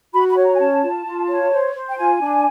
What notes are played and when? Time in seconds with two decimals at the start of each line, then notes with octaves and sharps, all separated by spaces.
0.13 F#4 B5
0.29 B5
0.37 C#5
0.44 A#5
0.54 G#5
0.59 C#4 A5
0.83 F4
1.06 F4
1.29 C#5
1.51 C5
1.75 C5
1.89 G5
1.97 F4 G#5
2.21 D4